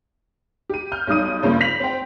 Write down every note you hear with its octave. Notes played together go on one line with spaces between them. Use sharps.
G4 D#7
F6 G6
B1 G3 D#4 D#6 D#7
A#1 G2 A#2 C#3 C5 G6
B6 F7 F#7
C4 C5 G5